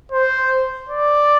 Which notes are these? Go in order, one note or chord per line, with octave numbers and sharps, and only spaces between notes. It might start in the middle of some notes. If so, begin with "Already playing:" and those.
C5
D5